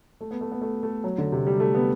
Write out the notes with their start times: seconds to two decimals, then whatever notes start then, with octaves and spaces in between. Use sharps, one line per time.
0.21 A3
0.31 B3
0.41 A3
0.52 B3
0.61 A3
0.83 A3
1.04 F#3
1.18 D3
1.32 C3
1.47 G3
1.60 A3
1.75 B3